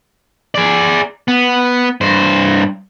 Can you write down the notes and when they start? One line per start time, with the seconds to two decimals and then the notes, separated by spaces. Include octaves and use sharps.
0.55 G#4 D5
1.28 B3
2.01 G2 C5